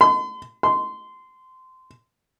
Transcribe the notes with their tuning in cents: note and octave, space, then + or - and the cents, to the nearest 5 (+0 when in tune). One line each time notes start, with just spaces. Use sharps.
C6 -45
C6 -20